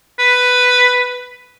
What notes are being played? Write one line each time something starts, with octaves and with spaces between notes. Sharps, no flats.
B4